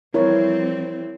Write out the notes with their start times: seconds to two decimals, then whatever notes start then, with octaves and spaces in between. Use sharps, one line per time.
0.14 E3 F3 G3 C4 E4 A#4 C#5